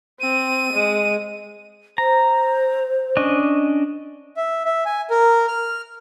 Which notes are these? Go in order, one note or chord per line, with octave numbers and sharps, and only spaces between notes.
C4 D#7
G#3
C5 A#5
C#4 D4 D#5
E5
E5
G#5
A#4
F6